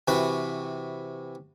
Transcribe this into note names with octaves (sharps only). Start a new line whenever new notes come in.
C3 E3 F#4 B4 B5